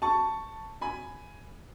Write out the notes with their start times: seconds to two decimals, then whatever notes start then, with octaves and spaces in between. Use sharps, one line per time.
0.02 A5 C#6
0.81 G#5 B5